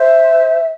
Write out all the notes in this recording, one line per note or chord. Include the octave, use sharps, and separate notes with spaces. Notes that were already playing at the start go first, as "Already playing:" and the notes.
Already playing: C5 E5